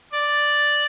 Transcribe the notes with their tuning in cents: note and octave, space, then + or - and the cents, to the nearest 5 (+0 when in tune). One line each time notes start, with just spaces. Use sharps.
D5 +0